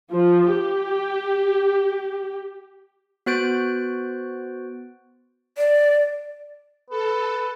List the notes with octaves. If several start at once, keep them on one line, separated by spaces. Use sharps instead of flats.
F3
G4
B3 F#4 C5 F#6 A6 D7
D5
A4 B4